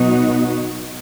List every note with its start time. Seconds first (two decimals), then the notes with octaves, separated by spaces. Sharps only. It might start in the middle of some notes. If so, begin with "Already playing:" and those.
Already playing: B2 F#3 B3 D#4 F#4